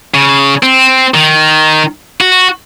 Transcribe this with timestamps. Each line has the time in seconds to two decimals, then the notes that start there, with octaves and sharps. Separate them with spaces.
0.14 C#3
0.63 C4
1.14 D#3
2.21 F#4